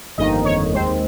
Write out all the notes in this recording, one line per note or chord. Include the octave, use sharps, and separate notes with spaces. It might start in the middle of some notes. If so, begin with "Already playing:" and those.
G1 F2 D#3 A#3 D#4 D#5
C#5
D#2 D#3 G#3 C4 C5